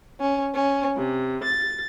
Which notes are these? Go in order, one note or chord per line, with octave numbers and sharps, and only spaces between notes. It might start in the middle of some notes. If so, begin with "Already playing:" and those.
C#4
C#4
C3
A6